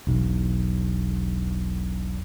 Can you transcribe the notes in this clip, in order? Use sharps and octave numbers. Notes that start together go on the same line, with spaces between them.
E1 B1